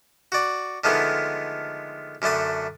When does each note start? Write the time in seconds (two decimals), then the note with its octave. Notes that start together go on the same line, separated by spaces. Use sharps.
0.32 F#4 D5
0.84 D3 D#3 F3 G#3 A3 B3
2.22 F#2 D3 A3 A5 D#6